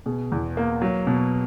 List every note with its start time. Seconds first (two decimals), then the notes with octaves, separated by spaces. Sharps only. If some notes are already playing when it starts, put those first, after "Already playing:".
0.06 B2 G#4
0.32 E2
0.57 A#3
0.82 F#3
1.07 B2